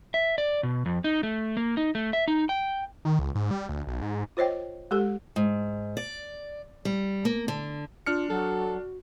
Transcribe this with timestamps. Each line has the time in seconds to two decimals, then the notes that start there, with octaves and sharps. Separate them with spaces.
0.14 E5
0.38 D5
0.63 B2
0.86 F2
1.04 D#4
1.23 A3
1.57 A#3
1.77 D#4
1.95 A3
2.13 E5
2.28 D#4
2.49 G5
3.05 D#3
3.19 C#2
3.35 G#2
3.51 G3
3.69 D2
3.87 B1
4.02 G#2
4.37 F4 C5 C#5 D#5 G5
4.91 G#3 G4 A4
5.36 G#2
5.97 D5
6.85 G3
7.25 A#3
7.48 D3
8.06 D4 F4 F6 C#7
8.30 F#3 F#4 A4